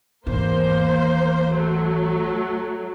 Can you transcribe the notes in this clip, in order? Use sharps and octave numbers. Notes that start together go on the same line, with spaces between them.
G#1 E2 A#3 C5
F#3 A3